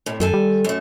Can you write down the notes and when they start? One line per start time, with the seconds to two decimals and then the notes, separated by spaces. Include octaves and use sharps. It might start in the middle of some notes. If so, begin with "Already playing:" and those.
0.06 A2 C3
0.20 F#2 D#3 A4 G#5
0.34 G3
0.64 F#2 A3